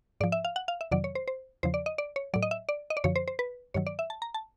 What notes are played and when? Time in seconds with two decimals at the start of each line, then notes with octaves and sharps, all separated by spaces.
0.21 G#2 F3 D5
0.32 E5
0.45 F5
0.56 F#5
0.68 F5
0.81 E5
0.91 F2 C3 D#3 F#3 D5
1.04 C#5
1.15 C5
1.28 C5
1.63 E2 C#3 F3 C5
1.74 D5
1.86 D#5
1.98 D5
2.16 C#5
2.34 A2 F#3 D5
2.43 D#5
2.51 E5
2.69 D5
2.90 D#5
2.97 D5
3.04 F#2 D3 F3 C#5
3.16 C5
3.28 C5
3.39 B4
3.74 G2 D#3 F#3 C#5
3.87 D5
3.99 E5
4.10 A5
4.22 A#5
4.34 A5